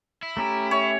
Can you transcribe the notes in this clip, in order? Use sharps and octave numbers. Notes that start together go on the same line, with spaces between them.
E4
A3 C#4 G4 A#5
C#5 E5